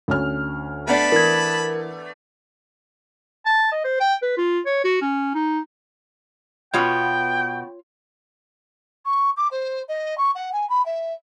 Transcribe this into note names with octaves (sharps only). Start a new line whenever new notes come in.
D2 C#4 F6
A3 B3 D4 B4 A5 B5
E3 A#4 G#6
A5
D#5
C5
G5
B4
F4
C#5
F#4
C#4
D#4
B2 B3 F4 F#4 C#5 G5
C#6
D6
C5
D#5
C#6
F#5
G#5
B5
E5